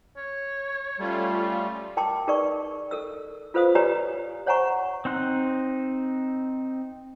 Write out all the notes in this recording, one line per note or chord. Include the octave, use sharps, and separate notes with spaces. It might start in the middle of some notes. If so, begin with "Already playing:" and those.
C#5
G3 A3 C#4 F4
A#4 G5 A5 C6 D6
D#4 G#4 A#4 B4 D5 C#6
A4 A#4 E6
F4 A4 B4 C5 F5 D#6
G4 B4 C#5 D5 G#5 A#5
C5 C#5 F#5 G#5 A#5 C#6
C4 D#4 C6 F#6